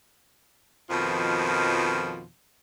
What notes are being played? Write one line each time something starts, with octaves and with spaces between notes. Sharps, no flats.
F2 B2 D#3 F3